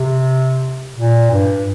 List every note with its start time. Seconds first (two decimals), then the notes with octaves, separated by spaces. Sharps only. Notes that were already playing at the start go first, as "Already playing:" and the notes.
Already playing: C3
0.95 A#2
1.31 G2